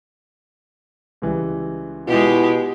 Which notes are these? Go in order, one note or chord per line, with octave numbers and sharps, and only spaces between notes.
C#2 E3 G3
B2 G#3 E4 F4 G4